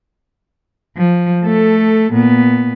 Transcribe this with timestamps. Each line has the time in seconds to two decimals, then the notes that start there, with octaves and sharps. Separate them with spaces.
0.97 F3
1.44 A3 A4
2.12 A#2 B3